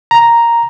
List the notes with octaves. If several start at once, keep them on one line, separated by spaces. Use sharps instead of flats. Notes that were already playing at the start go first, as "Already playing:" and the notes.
A#5